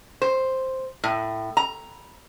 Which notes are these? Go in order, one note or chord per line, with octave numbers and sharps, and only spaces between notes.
C5
A2
A#5